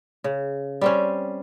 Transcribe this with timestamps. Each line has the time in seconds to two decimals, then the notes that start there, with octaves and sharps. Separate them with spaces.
0.24 C#3
0.81 G3 C4 C#4